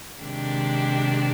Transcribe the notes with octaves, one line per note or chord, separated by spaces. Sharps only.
C3 D#3 G#3 D4 G4